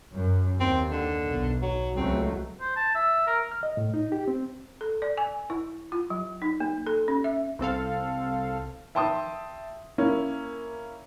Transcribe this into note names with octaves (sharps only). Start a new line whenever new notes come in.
F#2
D#2 C4
D3
B1
F#3
C#2 F#3 A3 C4
C5
A5
E5
A#4
F6
D#5
A2
D#4
G4
C4
A4
D5
G#5
E4
F4
F#3
D#4
A#3
A4
C#4
E5
C2 C4 A4 F5
E5 G5 A5 C6 D#6
A#3 C#4 E4